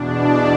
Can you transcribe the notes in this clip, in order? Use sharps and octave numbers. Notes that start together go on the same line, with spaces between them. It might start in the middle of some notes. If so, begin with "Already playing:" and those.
Already playing: E2 B2 D4
D5